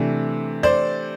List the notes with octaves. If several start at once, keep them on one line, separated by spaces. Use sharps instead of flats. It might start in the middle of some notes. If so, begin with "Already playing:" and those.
Already playing: C3 E3 A3 D4
C5 D5